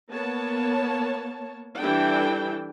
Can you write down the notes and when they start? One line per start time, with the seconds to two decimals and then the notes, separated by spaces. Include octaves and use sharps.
0.12 A#3 B3 C#5 A5
1.80 E3 G3 D4 E4 A4 G5